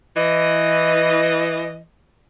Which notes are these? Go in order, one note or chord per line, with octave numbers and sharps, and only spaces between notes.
E3 D#5